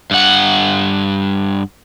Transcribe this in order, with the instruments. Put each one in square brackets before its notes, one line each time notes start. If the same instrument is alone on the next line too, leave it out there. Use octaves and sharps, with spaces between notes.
[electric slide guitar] G2 F#5